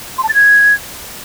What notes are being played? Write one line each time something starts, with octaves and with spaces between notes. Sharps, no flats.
C6
A5
A6
G#6